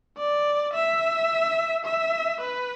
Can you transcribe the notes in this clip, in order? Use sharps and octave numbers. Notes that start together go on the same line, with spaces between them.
D5
E5
E5
B4